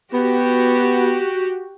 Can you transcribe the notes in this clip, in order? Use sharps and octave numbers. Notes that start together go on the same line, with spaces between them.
B3 F#4 G4